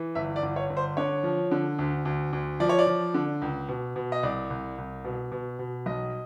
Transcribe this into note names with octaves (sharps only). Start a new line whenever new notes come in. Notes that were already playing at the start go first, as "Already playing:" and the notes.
Already playing: E3
G1 E5
D5
G1
C#5
G1
C5
D3 C#5
F3
D3
D2
D2
D2
F3 D5
C#5
D5
F3
D3
C#2
B2
B2
D#5
C2 D5
C2
C2
B2
B2
B2
B1 D#5